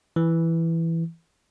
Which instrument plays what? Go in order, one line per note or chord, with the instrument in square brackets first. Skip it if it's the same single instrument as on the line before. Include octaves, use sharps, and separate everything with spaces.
[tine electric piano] E3